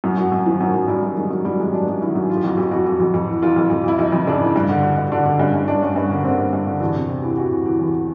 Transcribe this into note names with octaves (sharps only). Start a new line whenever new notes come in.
F#2 F#3
F#2 F#3
F#2
D#3 F3
F#2 F#3
F#2
F#2 G3
F#2
D#3 G#3
F#2
F#2 G3
D#3 G#3
F#2 D4
F#2
D#3 E4
F#2
E3 F4
G4
F2 F#4
F2 G4
F2 F#4
F2
F2
F2
E3
E3 F4
F2
F2
F2 E4
F2 D#4
F2
C#3 D4
E3
G2
D3
D3
G2
D3 D4
D3
G2 C#4
G2
G2 D4
G2 C#4
G2 B3
D3 A#3
D3 C4
G2
G2
D3
E2 D4
C3
C3
E3
E3 F#4
C3
E3
E2